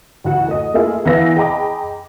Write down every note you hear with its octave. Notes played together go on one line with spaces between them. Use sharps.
A1 D2 F#4 F#5
A3 D#5
A3 A#3 E4 F4 G#4
E2 E3 B4 E5 F5 A#6
G#4 D#5 G5 A#5 B5 D6